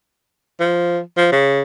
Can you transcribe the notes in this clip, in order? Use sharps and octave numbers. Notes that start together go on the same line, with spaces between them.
F3
F3
C#3